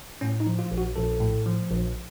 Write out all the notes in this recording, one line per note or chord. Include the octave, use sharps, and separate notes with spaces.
A2 C#4
D#4
F3
F4
A#1
F#4
A#1 A4
A2
F3
A#1